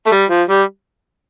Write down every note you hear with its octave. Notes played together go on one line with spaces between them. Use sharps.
A3
G3
F3
G3